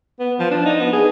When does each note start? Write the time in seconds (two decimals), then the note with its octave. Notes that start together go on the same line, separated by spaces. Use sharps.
0.20 B3
0.39 F3
0.51 D4
0.65 D#4
0.80 B3
0.93 G#4